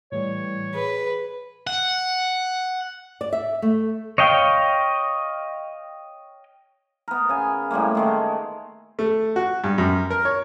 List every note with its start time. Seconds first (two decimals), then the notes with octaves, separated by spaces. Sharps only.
0.12 A2 E3 G3 C#5
0.75 G#4 B4
1.67 F#5
3.21 D5
3.33 E5
3.62 A3
4.18 C#5 D#5 F5 G5
7.08 B3 A#4
7.29 C#3 G#5
7.71 A2 G3 G#3 A#3
7.95 D#3 G#3 A3
8.99 A3
9.36 F#4
9.64 G2
9.78 F#2
10.10 A#4
10.25 C#5